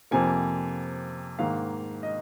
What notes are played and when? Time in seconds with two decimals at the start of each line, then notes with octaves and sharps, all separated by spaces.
0.11 F2 C3 F3 A#3 G#5
1.39 G#2 D#3 A#3 F5
2.03 D#5